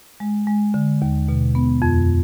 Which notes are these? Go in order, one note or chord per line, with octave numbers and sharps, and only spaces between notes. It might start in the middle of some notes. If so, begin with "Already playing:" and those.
G#3
G#3
D3
D#2
B2
B3
F2